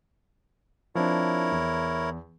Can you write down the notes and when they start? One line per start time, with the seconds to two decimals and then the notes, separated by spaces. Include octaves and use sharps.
0.95 F3 C4 D4 E4 A#4 C#5
1.52 E2